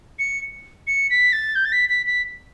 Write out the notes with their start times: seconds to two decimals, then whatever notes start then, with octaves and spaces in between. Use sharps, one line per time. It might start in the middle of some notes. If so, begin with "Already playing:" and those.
0.19 C#7
0.87 C#7
1.10 B6
1.33 A6
1.55 G6
1.65 A6
1.72 B6
1.89 B6
2.06 B6